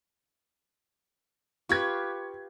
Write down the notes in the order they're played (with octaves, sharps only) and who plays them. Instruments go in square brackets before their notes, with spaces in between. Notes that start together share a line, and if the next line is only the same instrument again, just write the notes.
[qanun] F4 G4 B4 [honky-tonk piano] C#6 G#6